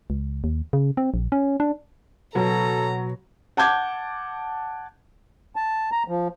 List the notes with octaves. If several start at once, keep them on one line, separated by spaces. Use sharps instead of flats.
C#2
D#2
C#3
C4
A#1
C#4
D4
B2 F#3 A4 A#5
F#5 A5 D6 G6 G#6
A5
A#5
F3